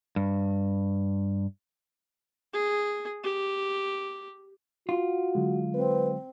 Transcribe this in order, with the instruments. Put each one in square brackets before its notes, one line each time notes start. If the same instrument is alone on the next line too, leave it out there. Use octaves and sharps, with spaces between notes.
[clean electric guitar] G2
[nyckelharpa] G#4
G4
[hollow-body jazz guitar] F4 [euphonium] F#4
[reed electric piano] D3 F#3 G#3
[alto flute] C4 [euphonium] B4